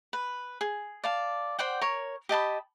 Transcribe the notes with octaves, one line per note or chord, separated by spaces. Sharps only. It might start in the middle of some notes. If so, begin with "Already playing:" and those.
B4
G#4
D5 F5 A5
C5 D5 F#5 G5
A#4 C#5
G4 D#5 A5 B5